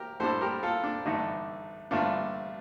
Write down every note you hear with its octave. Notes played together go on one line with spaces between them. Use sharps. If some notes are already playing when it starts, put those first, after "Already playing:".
Already playing: G4 A#4
A#1 A2 G3 D4 A4 C5
G4 A#4
F4 A4
D4
A1 G2 D3 A3 D4 D#4
A1 G2 D3 A3 D4 F4